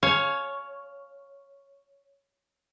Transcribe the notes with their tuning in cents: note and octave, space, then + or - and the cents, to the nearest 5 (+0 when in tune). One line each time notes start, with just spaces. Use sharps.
C#5 +0 F5 +0 G#5 +35